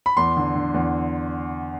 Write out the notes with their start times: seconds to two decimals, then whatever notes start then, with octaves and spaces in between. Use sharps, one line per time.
0.06 B5
0.17 E2 C6
0.37 D3
0.55 D3
0.74 E2